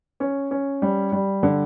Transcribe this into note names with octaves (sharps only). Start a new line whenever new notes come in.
C#4
C#4
G3
G3
D3